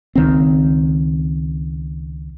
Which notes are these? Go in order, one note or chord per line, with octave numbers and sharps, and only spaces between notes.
C#2 D#3 C4